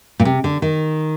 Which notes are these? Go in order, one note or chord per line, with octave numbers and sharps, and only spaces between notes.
A#2
C3
D3
D#3